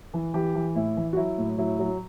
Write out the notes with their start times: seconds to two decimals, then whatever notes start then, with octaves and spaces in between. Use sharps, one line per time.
0.14 E3
0.34 E3 G4
0.55 E3
0.75 A2 E4
0.97 E3
1.13 F#4
1.17 F#3 E4
1.38 A2
1.58 F#3 E4
1.79 F#3